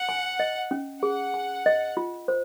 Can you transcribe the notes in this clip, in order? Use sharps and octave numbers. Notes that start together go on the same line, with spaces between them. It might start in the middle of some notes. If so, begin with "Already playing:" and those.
Already playing: F#5
G#5
D#5
C#4
G#4 F#5
G#5
D#5
F4
C5